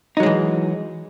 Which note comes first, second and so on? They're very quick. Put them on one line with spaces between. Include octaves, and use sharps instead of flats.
D#4 F#3 G#3 E3